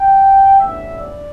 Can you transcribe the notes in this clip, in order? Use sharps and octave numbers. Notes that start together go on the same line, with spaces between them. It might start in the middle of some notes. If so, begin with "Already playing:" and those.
Already playing: G5
A1 A2 E3 B3 D4 E5
D5